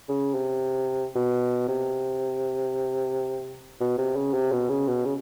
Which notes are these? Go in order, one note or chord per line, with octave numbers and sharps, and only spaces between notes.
C#3
C3
B2
C3
B2
C3
C#3
C3
B2
C#3
B2
C#3